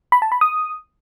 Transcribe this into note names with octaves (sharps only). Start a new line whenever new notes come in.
B5
A5
B5
D#6